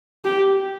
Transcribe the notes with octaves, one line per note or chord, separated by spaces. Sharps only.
G4